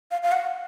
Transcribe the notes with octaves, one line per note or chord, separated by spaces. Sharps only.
F5
F5
F#5